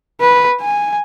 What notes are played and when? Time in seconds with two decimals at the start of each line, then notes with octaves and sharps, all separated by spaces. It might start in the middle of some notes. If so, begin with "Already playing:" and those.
0.21 B4
0.61 G#5